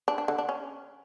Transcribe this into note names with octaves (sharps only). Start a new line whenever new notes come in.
D4
D4
D3
D4
C#4